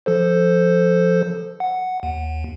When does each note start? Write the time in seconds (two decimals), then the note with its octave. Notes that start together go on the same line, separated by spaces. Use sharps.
0.06 F3 A4 C5
1.60 F#5
2.03 D#2